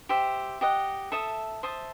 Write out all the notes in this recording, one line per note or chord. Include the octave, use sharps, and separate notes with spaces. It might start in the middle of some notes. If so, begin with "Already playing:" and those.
G4 C5 E5
G4 D#5 F#5
A4 E5 A5 D#6
C5 E5 A5 D#6